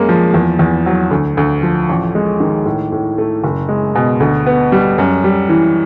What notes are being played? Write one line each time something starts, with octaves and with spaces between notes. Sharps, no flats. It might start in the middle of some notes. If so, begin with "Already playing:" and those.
Already playing: F#2 G#3 A#3
F3
E2
E2
F#3
D2
D2
F3
A1
G#3
D#3
A2
A2
A3
F#1
G#3
B2
D2
B3
G3
F#2
G3
E3